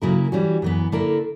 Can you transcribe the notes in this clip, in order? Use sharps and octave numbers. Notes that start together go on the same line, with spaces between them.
C#3 F#3 A#3 E4 A#4
E3 G3 C#4 F#4
F#2 E3 B3
D3 A#3 E4 A#4